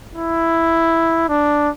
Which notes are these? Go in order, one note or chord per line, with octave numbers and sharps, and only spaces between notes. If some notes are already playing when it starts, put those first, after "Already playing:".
E4
D4